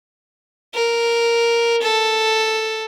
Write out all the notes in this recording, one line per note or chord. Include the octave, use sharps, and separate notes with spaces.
A#4
A4